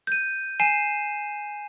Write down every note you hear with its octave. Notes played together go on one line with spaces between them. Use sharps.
G6 D#7
G#5 C7 D#7 E7